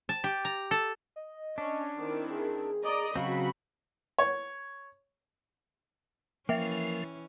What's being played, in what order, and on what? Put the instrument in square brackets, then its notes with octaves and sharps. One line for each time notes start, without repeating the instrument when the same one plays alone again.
[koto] A5
G4
A#5
A4
[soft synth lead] D#5
[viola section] C#4 [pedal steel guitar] D4
[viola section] D#3 C4 E4 [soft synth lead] D6
[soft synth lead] G#4
[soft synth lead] G#4 [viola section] D5 D#5 A#5
[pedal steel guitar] C#3 F#3 C4 [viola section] F#4 B5 [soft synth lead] F5
[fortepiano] C#5
[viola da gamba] E3 C#4 [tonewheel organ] F3 [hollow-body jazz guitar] A#3 [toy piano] E5 G5